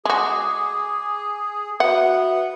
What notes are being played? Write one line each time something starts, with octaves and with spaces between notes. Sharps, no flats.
G#3 F#4 G#4 D6
B3 F#4 E5 F#5